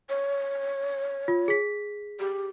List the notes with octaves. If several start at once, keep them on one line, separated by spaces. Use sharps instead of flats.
C#5
F4
G#4 B6
G4